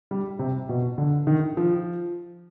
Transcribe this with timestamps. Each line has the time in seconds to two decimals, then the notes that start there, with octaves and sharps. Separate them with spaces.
0.11 G3
0.39 C3
0.69 B2
0.98 D3
1.27 D#3
1.57 F3